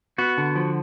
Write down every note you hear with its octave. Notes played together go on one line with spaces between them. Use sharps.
B3 F#4
D3
F3